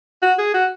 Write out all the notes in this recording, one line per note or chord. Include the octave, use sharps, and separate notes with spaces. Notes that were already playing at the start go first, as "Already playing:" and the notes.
F#4
G#4
F#4